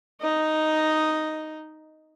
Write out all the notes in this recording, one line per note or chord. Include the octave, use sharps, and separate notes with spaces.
D#4 D#5